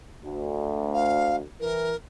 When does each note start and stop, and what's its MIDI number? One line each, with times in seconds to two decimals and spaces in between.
0.23 1.42 38
0.94 1.36 77
1.60 1.92 52
1.60 1.96 70